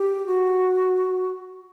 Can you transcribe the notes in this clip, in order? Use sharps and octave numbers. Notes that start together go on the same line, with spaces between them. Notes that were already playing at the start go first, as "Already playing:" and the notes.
Already playing: G4
F#4